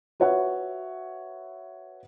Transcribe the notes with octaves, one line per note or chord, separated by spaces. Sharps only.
F#4 B4 C#5 E5 F#5